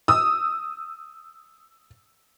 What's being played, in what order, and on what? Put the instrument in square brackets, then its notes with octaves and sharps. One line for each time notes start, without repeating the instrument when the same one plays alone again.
[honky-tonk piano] D#6 E6